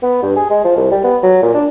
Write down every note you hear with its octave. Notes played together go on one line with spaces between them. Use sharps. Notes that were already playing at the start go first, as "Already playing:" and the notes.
B3
G2
G#4
G#3
F3
C2
G3
B3
F#3
A#2
D4